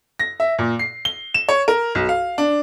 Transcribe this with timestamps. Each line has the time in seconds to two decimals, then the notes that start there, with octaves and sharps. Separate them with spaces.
0.19 A#6
0.40 E5
0.59 A#2
0.79 C7
1.05 G7
1.34 E7
1.49 C#5
1.68 A#4
1.95 B1
2.09 F5
2.38 D4